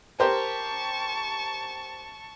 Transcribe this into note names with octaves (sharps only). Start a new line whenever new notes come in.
G4 A#4 C5 A5 C#6